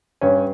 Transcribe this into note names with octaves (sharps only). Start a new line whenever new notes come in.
G2 C#4